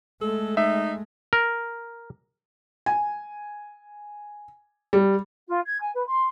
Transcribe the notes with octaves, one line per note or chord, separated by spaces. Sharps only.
G#3 A3 A4
D#4 E5
A#4
G#5
G3
F4
G#6
G#5
B4
C6